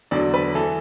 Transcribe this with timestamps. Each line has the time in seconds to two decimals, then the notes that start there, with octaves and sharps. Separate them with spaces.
0.11 E2 D3 F#3 D5
0.34 B4
0.55 E3 A4